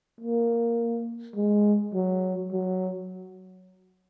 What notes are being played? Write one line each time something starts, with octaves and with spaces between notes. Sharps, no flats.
A#3
G#3
F#3
F#3